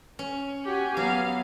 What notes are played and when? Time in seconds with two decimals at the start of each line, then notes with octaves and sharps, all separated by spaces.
0.19 C#4
0.64 F#4 G4 G#5
0.97 F#3 B3 F5